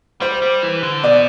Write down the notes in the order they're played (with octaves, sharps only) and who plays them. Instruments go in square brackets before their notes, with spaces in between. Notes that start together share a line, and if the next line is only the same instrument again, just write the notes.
[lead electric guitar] G3 [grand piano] C5
[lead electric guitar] G3
E3
D3
[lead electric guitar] B2 [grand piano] D5